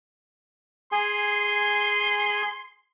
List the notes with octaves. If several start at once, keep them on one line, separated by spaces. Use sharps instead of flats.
G#4 G#5 C6